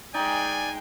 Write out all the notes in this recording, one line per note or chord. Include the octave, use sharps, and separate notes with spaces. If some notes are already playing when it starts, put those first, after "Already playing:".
G#3 D#4 D5 G5 G#5